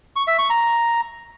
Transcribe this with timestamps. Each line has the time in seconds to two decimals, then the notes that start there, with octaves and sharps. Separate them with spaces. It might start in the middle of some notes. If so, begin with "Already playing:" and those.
0.16 C#6
0.27 E5
0.39 C#6
0.50 A#5